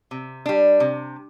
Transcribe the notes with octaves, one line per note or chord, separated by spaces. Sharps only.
C3
G3 D4
C3